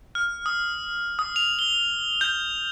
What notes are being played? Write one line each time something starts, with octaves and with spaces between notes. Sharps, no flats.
F6
D#6
D#6
F7
G7
G6